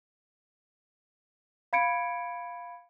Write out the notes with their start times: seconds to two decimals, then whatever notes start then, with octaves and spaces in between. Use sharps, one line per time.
1.73 F5 B5 G#6 C#7 D7